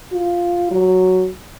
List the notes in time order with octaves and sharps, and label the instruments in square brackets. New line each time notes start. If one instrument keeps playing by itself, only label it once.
[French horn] F4
F#3